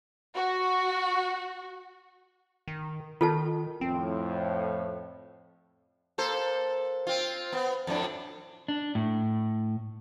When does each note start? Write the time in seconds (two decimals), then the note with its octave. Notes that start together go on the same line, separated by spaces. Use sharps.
0.36 F#4
2.68 D#3
3.21 D#3 F4 A4 A5
3.81 F2 A2 C4
6.18 A#3 A4 C5
7.07 C4 F4
7.53 B3
7.87 F2 A2 D4
8.68 D4
8.95 A2